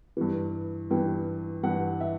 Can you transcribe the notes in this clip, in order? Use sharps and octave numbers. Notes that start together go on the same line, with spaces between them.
G2 E3
G2 E3 G5
G2 E3 F#5
E5